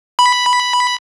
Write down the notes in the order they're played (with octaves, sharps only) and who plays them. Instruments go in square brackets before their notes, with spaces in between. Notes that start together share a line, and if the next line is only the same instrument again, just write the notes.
[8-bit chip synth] B5